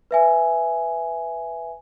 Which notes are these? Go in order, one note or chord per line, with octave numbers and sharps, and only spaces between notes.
B4 E5 G#5